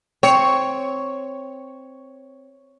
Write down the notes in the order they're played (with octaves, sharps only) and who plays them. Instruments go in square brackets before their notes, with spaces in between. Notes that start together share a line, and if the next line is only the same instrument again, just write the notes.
[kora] C4 [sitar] C#5